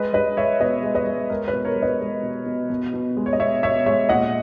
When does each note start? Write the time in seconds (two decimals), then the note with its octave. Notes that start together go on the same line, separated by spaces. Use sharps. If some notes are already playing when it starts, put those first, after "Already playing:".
Already playing: G#3 B4 D#5
0.13 G#3 B4 D#5
0.37 G#3 C#5 E5
0.60 B2 B4 D#5
0.83 G#3
0.95 B4 D#5
1.07 G#3
1.30 G#3 A#4
1.48 B4
1.53 B2
1.65 A#4 C#5
1.76 G#3
1.82 B4 D#5
2.01 G#3
2.23 B2
2.46 B2
2.70 B2
2.94 B2
3.17 G#3
3.26 C#5
3.33 D#5
3.39 B2 C#5 E5
3.63 B2 C#5 E5
3.86 G#3 C#5 E5
4.09 A#2 D#5 F#5